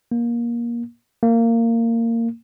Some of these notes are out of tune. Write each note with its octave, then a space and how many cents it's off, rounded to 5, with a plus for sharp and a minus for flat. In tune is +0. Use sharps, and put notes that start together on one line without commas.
A#3 +20
A#3 -20